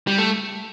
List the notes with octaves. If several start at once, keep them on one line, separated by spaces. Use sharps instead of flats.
G3
A3